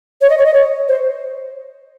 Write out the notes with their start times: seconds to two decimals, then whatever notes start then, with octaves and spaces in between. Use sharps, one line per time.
0.21 C#5
0.29 D#5
0.37 C#5
0.45 D#5
0.54 C#5
0.88 C5